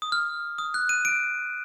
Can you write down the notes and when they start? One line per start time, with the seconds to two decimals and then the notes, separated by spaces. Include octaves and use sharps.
0.02 D#6
0.12 F6
0.58 D#6
0.74 F#6
0.89 D#7
1.05 D7